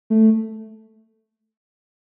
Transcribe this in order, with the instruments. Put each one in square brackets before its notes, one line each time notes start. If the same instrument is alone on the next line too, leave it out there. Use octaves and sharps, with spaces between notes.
[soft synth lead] A3